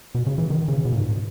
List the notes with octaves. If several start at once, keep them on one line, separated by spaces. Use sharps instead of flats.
B2
C#3
E3
D#3
C#3
B2
A#2
G#2